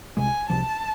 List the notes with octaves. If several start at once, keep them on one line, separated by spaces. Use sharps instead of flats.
C2 C3 G#3 G#5
C2 C3 F3 A5